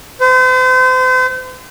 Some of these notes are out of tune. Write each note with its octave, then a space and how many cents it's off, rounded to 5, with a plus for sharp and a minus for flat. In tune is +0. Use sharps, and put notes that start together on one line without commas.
C5 -40